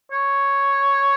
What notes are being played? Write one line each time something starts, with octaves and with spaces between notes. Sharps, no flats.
C#5